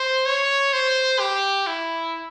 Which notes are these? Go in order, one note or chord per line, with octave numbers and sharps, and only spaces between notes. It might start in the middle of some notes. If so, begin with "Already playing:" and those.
Already playing: C5
C#5
C5
G4
E4